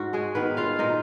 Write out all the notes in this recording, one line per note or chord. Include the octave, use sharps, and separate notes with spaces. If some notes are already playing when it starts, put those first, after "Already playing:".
Already playing: G#2 F#4
G#3 G#4
D#3 B3 B4
F4 F5
A#2 D#4 D#5